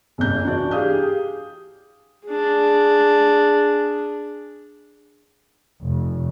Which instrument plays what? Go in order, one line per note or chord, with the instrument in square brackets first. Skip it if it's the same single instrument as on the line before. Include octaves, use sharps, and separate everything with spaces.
[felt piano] F#1 C2 G6
E3 D4 F#4 D5
G4 G#4 F5 D#6 G6
[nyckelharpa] D4 G#4
[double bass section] F1